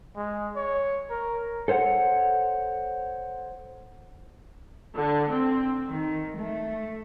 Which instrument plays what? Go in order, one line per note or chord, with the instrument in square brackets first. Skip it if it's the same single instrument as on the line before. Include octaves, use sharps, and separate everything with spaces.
[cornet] G#3
C#5
A#4
[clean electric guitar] A4 C5 C#5 F#5
[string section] D3
C4
D#3
A3